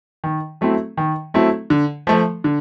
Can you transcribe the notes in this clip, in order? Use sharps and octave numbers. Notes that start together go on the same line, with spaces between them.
D#3
F#3 A3 C4 E4
D#3
F#3 A3 C4 E4
D3
F3 A3
D3